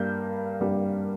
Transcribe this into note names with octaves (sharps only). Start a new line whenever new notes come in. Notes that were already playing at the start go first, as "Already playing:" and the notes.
Already playing: G2 G3 A#3 G6
G2 G3 A#3